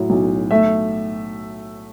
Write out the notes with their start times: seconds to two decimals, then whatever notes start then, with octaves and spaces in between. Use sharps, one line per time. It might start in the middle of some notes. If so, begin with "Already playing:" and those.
Already playing: A2 F#3
0.10 B1
0.51 A3 E5